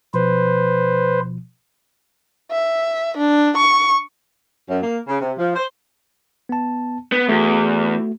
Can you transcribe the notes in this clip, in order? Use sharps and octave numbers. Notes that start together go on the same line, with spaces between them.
B2 F3 B4 C5
E5
D4
C#6
F#2
A#3
C#3
C3
F3
C5
B3 A5
B3
E2 A3 F#4